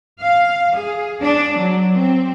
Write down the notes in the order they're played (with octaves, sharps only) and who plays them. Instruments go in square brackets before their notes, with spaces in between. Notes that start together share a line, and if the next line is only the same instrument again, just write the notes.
[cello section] F5
G#4
D4
F#3
C4